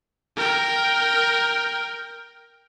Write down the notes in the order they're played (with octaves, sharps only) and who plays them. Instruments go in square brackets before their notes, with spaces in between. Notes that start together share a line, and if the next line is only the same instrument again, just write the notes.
[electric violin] A#4 G5